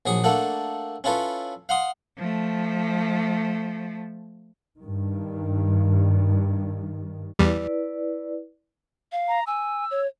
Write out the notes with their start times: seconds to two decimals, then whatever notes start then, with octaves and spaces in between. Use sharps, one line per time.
0.06 A#1 F#3 G#4 C#6 D#6
0.24 A3 A#3 D4 A4 F#5
1.04 C#4 E4 F4 A4 B4 C#5
1.69 F5 F#5 C6 D#6
2.18 F3 A3
4.78 G2 D#3
7.39 E2 G3 E4 B4 D5
9.12 F5
9.28 A#5
9.47 G#5 E6
9.91 C#5